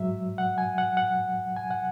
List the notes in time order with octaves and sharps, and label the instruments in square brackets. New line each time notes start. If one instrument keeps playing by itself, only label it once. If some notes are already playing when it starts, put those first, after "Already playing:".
Already playing: [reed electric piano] G#2 F#3 E5
F#5
G#5
F#5
F#5
G#5
F#5